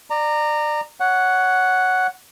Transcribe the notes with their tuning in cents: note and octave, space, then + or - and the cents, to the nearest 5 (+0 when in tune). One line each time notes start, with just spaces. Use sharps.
D5 +25 A#5 -15
C#5 +10 F#5 +0